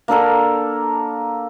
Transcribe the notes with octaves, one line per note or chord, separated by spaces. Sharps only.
A#3 D4 A4 A#4